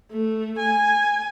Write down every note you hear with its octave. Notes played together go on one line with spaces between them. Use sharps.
A3
G#5